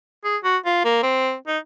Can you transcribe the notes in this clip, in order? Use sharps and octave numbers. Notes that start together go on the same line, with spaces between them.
G#4
F#4
F4
A#3
C4
D#4